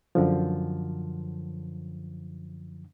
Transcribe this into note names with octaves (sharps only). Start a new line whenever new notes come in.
F#2 D3 F3